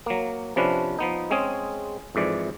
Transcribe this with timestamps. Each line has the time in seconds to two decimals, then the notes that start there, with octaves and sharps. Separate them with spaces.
0.06 F#3 A#3
0.56 C3 F3 C#4 D4 B4
0.99 F3 B3 D#4
1.31 G#3 C4 C#4 G#4
2.15 F2 G#2 E3 D5